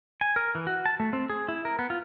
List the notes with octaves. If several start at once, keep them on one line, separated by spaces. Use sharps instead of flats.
G#5
A#4
E3
F#4
A5
A3
C4
G#4
E4
A#4
B3
F4